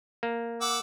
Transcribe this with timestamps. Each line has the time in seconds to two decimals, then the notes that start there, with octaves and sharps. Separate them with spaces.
0.23 A#3
0.61 F#5 D6 E6